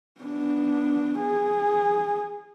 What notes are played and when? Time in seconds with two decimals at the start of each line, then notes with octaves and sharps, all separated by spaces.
0.21 B3 D4
1.20 G#4